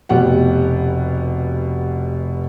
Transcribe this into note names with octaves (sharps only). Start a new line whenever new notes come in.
F1 B2 G4 F#5